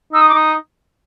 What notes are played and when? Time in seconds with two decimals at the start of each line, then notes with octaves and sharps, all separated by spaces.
0.13 D#4 E6
0.21 D#6
0.29 D6
0.34 D#4 D#6